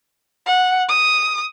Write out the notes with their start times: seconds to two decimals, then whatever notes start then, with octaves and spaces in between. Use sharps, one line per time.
0.46 F#5
0.88 D#6